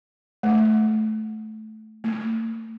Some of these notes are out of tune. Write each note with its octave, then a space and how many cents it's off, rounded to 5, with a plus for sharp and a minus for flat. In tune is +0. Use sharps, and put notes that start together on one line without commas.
A3 -15
A3 +40